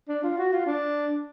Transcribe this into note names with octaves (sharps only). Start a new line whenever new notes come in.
D4
F4
F#4
F4
D4